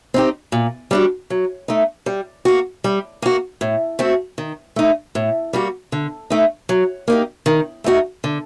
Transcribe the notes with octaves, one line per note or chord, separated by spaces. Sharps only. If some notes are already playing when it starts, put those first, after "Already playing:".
C4 D#4 G4
A#2
G3 D4 F#4
F#3
A3 D#4
G3
A#3 F#4
G3
A#3 F#4
A2
A3 C4 F#4
D#3
A3 D#4
A2
G3 A#3 F#4
D3
A3 D#4
F#3
A#3 D#4 G4
D#3
A3 D#4 F#4
D3